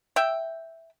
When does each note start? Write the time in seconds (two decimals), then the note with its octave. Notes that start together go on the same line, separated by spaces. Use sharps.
0.16 E5 G5